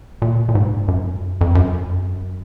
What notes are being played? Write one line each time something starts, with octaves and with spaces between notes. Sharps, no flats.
A#2
A#2
G#2
F#2
F2
F#2